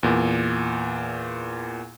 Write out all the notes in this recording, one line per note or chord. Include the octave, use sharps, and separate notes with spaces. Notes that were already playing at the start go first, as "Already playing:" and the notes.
E2 A#2